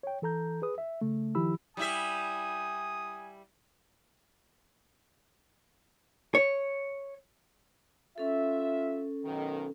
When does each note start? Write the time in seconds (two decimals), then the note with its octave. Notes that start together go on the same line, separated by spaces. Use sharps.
0.03 C#5 G5
0.22 E3 A4 A#5 G6
0.62 G#4 B4 D#6
0.78 E5
1.01 C#3 A3
1.35 D#3 F3 E4 G4 B5 E6
1.77 G3 E4 E5 G#5 D#6
6.35 C#5
8.18 C#4 F4 A4 E5
9.25 B1 D#3